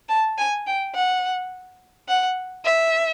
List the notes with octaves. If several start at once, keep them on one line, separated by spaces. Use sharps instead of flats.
A5
G#5
G5
F#5
F#5
E5